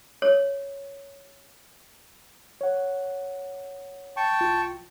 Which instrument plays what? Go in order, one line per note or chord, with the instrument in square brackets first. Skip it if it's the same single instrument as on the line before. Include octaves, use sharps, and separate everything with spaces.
[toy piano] C#5
[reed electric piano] C#5 F#5
[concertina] G5 A5 C#6
[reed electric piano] C2 F4